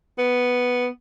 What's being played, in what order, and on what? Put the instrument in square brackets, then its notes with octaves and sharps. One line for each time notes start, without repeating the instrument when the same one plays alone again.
[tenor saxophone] B3